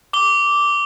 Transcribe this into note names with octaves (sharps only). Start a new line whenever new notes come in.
D6 G7